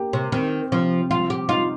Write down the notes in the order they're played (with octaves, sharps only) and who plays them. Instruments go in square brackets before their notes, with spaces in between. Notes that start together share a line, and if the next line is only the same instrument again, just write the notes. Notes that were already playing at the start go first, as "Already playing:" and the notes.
Already playing: [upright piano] A#3 G4
[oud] C3
[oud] D#3 [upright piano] C4
[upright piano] C3 [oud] F3
[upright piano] F3 [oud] F4
[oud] G4
[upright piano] D#4 [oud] F4